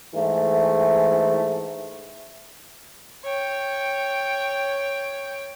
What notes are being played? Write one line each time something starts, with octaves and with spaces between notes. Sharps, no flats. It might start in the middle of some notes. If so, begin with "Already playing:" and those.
G#2 E3 A3
C#5 G5